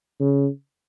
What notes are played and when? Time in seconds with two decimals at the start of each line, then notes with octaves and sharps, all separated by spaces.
0.20 C#3